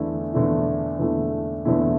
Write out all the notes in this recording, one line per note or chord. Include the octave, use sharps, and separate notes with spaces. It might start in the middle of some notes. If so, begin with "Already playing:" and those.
Already playing: E2 D3 A3 E4
E2 D3 A3 E4
E2 D3 A3 E4
E2 D3 A3 E4